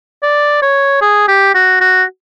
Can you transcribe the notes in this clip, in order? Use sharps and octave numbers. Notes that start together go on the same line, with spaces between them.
D5
C#5
G#4
G4
F#4
F#4